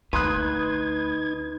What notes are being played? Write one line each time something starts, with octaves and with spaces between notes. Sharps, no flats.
D2 D#4 B4 C6 D#6 F#6 G#6